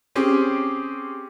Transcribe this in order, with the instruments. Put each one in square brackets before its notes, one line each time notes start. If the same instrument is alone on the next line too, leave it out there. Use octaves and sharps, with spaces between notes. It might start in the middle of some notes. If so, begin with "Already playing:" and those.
[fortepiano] C4 C#4 G4 G#4